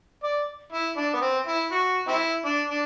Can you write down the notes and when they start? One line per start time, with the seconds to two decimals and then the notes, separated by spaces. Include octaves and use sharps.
0.23 D5
0.72 E4
0.97 D4
1.14 B3
1.22 C4
1.47 E4
1.72 F#4
2.08 C4 E4
2.45 D4
2.70 D4